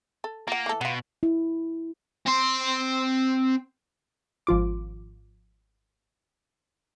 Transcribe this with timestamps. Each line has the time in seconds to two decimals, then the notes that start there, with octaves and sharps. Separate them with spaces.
0.24 A4
0.48 A#3 F4 F#5
0.66 E3 A4
0.81 B2 B3 F4
1.23 E4
2.26 C4 C6
4.47 G#1 F3 F4 D6